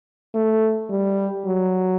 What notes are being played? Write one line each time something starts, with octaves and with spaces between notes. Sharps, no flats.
A3
G3
F#3